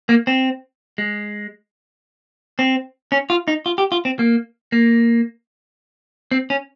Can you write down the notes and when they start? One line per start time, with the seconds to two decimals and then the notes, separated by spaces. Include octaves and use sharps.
0.09 A#3
0.27 C4
0.98 G#3
2.59 C4
3.12 C#4
3.30 F4
3.48 D#4
3.66 F4
3.78 G4
3.92 F4
4.05 C4
4.19 A#3
4.72 A#3
6.31 C4
6.50 C#4